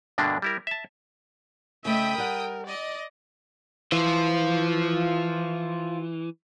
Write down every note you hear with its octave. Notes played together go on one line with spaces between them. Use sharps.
G2 B2 D3 A#3 D4
G3 E4 A#4
E5 A5
C#3 A3 D#5 E5 G5 B5 D#6
G3 A#4 F#5
D5 D#5
E3 F4 C5